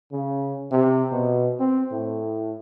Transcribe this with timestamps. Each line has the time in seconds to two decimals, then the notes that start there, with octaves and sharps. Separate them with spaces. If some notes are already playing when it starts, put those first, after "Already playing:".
0.12 C#3
0.72 C3
1.12 B2
1.60 C4
1.91 A2